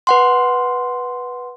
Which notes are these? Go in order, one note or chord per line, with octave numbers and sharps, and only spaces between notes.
B4 F#5 C6